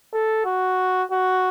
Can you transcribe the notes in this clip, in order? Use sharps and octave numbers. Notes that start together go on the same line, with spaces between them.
A4
F#4
F#4